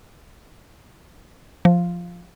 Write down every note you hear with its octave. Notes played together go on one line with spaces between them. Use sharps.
F3